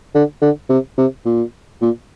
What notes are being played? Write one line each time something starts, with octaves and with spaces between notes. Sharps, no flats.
D3
D3
C3
C3
A#2
A#2